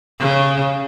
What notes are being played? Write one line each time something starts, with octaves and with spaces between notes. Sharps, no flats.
C#3